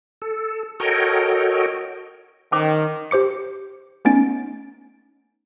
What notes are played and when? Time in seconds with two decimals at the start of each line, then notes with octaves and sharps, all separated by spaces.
0.22 A4
0.80 F#4 A4 A#4 C#5 D#5 G5
2.52 D#3 C#4 C5 D6
3.11 G4 C5 D6 C#7
4.05 A3 B3 C#4 D#4 A6 D7